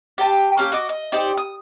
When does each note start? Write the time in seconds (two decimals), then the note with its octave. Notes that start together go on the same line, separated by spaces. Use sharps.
0.18 G4 G5 A5
0.57 A#3 C#4 G4
0.72 F#4 D#5 D6
0.89 D#5
1.12 D#4 G4 C5 D5
1.37 D#6